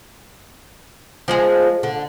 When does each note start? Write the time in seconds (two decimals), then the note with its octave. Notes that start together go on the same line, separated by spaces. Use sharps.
1.28 F3 G#3 G#4
1.83 D3